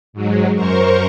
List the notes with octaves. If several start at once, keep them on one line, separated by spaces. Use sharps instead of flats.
G#2 F#3 G#3
F#2 A#4 C5 C#6